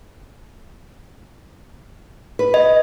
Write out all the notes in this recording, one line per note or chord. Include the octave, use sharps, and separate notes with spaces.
B4
D#5